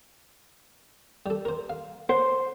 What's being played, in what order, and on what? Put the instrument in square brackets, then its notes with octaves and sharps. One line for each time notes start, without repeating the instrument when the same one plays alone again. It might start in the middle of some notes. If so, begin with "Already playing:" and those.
[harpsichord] G3 A4
A#4 C5
F5
[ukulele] C5 [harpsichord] F#5